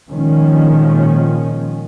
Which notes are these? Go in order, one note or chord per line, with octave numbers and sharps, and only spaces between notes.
A#2 D#3 F3 G#3 C#4